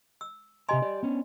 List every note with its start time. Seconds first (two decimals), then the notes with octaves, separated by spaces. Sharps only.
0.21 E6
0.69 C3 G4 D#5 G#5 A#5 C6
0.82 G4 D5
1.03 B3 C#4 D4